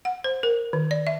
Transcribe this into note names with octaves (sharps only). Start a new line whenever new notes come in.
F#5
C5
A#4
D#3
D5
E5